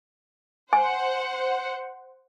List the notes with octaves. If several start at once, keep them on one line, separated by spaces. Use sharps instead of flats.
C5 F#5 G#5